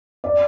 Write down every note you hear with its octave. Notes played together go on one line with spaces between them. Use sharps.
D5